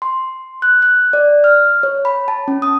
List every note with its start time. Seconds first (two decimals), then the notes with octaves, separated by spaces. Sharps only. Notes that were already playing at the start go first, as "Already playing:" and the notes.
0.02 C6
0.62 F#6
0.82 F#6
1.13 D5
1.44 F6
1.83 C#5
2.05 B5
2.28 A5
2.48 C#4
2.62 D#6